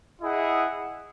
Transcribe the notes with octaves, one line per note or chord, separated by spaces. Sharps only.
E4 G#4 D#5 F#5